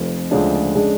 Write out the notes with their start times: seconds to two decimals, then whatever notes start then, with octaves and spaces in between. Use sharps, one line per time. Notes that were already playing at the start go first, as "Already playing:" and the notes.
Already playing: F1 F2 F3
0.31 D2 C#3 F3 G#3 D4
0.74 C#3 G#3 D4